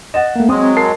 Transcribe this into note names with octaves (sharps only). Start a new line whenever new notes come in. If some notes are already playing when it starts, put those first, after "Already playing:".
D#5 F#5 A6 E7
A3 A#3
F#3 G#3 C4 C6 D#6
A#4 A5 C7